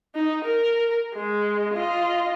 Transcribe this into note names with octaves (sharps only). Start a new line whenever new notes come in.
D#4
A#4
G#3
F4 D#5